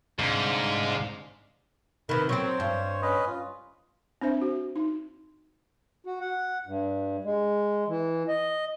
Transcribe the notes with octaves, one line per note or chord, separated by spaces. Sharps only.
C2 G#2 D3 C5 F5
C3 D#3 B4
F#3 C4 C5 C#5
G2
C#4 B4 D#5
F4
C4 D4 C5 E5
F#4
D#4
F#4
F#5
G2
G#3
E3
D#5